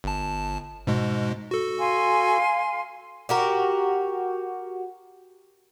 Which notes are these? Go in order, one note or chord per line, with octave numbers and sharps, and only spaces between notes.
G1 A5
G#2 B2 G#3
F#4 A4
F5 G#5 C6
F#4 G4 A#4